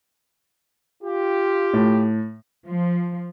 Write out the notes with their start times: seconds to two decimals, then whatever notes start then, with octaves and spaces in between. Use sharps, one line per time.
1.03 F4 G4
1.73 A2
2.65 F3